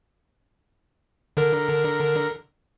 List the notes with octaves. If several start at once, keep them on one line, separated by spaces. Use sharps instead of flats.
D3 A#4